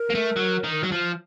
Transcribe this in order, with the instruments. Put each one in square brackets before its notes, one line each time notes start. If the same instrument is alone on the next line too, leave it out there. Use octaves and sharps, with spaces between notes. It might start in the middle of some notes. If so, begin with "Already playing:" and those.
Already playing: [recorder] A#4
[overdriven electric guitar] A#3
A3
F#3
D#3
F#3
F3